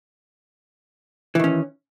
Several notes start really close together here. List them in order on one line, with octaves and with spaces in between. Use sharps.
E3 D#3 C#4